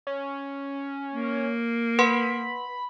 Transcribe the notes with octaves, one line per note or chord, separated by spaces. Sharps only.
C#4
A#3
B4 F#5 B5 C6